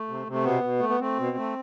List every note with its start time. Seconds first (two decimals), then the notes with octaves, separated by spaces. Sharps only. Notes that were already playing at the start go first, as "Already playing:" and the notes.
Already playing: A3
0.08 C3
0.27 C3 A3
0.45 B2 B3
0.63 B2
0.80 A3
0.89 B3
1.00 A3 C4
1.19 B2
1.37 A3